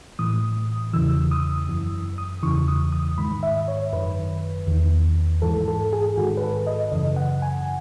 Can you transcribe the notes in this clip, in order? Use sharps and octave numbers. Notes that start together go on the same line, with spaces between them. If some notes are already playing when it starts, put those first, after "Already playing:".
A2 E3 D#6
E2 C#3 E3 E6
D#6
F#2 E3
D#6
E2 C#3 E3 C#6
D#6
D#6
G#2 D#3 B5
E5
C#5
F#2 D#3 B4
E2 D#3
G#2 E3 A4
A4
G#4
G#2 D#3 F#4
B4
A4
D#5
F#2 C#3 E3 D#5
F#5
G#5